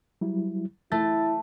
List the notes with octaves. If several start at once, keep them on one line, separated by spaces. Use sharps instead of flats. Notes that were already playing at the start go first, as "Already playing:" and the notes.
F#3 G3 E4
A3 E4 A6